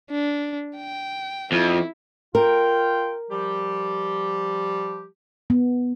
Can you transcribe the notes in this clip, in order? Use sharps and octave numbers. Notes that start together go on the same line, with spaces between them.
D4
G5
F2 E4
F4 A#4 G5
F3 G3 G4
B3